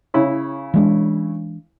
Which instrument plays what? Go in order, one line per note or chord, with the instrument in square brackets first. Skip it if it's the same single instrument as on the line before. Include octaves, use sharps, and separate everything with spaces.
[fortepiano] C#3 E4 C#5
[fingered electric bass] E3 G#3 D4